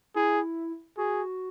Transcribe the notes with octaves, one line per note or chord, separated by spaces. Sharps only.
E4 G#4
F#4 G#4